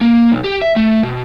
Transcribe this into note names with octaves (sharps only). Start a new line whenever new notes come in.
A#3
B1
G4
E5
A3
B2